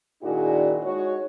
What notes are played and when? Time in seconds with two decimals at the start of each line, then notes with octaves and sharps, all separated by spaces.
0.23 A#2 D#3 D4 E4 F#4 G#4
0.83 G#3 D#4 F#4 C#5